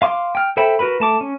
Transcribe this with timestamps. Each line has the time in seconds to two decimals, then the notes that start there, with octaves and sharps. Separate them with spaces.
0.02 F5 C6 D6
0.35 G5 F6
0.57 A4 C5 E5 G5 B5
0.79 F#4 A#4 B4 B5
1.00 A3 A5 D6
1.21 C#4